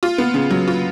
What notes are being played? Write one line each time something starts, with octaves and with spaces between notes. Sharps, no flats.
F4
B3
C#3
F#3
F4